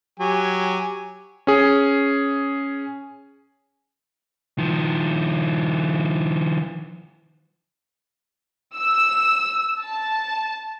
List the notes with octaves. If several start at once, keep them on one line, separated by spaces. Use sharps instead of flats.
F#3 G4 G#5
C#4 G#4
D#3 F3
E6
A5